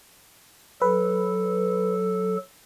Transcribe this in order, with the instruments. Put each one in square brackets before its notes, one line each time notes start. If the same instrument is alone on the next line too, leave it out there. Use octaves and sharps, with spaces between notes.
[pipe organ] F#3 A4 [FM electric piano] B4